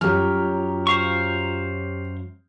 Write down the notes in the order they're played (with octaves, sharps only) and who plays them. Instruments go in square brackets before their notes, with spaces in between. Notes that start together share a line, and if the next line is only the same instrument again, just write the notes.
[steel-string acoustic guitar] F#2 F#3 [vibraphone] F4 G5 A#5 [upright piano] G4 F6
[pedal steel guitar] C5 F5 C#6